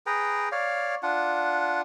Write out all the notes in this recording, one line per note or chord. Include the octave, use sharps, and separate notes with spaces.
G#4 B4 G5 A#5
C#5 D5 F5
D4 F4 F#5